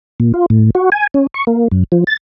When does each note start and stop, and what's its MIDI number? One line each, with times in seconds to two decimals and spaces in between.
0.20 0.32 46
0.34 0.46 65
0.50 0.70 45
0.75 0.90 66
0.92 1.07 80
1.14 1.27 61
1.34 1.45 85
1.47 1.68 58
1.72 1.84 42
1.92 2.04 53
2.07 2.17 93